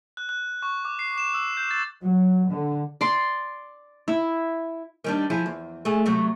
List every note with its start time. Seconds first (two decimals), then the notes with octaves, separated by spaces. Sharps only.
0.17 F#6
0.29 F#6
0.62 C#6
0.85 D6
0.99 C7
1.18 E7
1.34 E6
1.57 G6
1.71 A6
2.01 F#3
2.46 D3
3.01 D5 C6
4.08 E4
5.04 D#3 G3 D4
5.30 F3 E4 G#4
5.46 E2
5.85 A3 G#4
6.06 C3 F#3 A3